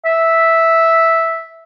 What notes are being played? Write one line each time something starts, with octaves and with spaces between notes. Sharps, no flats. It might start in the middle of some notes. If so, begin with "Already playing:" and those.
E5